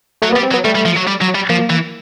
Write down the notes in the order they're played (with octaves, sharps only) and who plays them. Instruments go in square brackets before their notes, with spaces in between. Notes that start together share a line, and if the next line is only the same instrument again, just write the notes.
[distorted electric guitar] F#3 [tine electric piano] A3
[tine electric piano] A#3
B3
[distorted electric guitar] G3
[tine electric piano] C4
[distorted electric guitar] F#3
[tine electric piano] B3
[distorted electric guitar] G3 [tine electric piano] A3
[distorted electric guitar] G3
F3
F#3
G3
F#3
G3
[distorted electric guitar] F3 [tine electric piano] A#3
[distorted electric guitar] E3